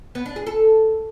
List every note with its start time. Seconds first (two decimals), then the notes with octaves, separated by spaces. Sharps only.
0.15 B3
0.26 D4
0.36 G#4
0.47 A4